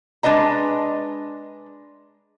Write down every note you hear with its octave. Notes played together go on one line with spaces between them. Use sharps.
G#3 D4 B4 D#5 A#5